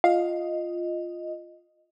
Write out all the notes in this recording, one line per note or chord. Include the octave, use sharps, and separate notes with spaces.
F4 D#5 F5